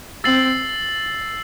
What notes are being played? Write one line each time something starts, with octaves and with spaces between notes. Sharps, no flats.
C4 E6 A6 C7 F#7